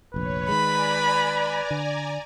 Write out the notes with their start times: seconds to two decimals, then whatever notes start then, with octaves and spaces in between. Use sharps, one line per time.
0.14 F1 A#1 B4 C#5
0.49 D#3 G#3 D5 G#5 A#5 B5
1.71 D3